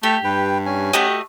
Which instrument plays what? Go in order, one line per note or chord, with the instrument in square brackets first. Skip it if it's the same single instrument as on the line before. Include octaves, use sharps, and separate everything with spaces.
[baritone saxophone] A3 [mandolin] G4
[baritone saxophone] G2 [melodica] B4 G5
[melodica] C#4 G#5
[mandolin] A3 F#4 D#5 [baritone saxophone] G4